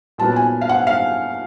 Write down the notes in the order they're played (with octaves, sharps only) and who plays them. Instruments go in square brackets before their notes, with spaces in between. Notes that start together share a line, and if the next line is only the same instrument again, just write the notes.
[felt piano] A#2 F#3 B3 A5
G#5
F5
F#5
F5